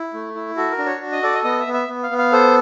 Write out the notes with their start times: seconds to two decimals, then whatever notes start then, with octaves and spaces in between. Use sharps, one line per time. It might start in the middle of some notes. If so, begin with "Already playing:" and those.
Already playing: E4
0.14 A3
0.35 E4
0.57 F#4 A4
0.71 A#4
0.78 D4
0.86 C#5
1.01 F#4
1.12 D#5
1.23 A4 D5
1.34 D#5
1.44 B3 D#5
1.60 E5
1.67 B3
1.74 E5
1.88 B3
2.03 F5
2.11 B3
2.18 F5
2.32 A4 C5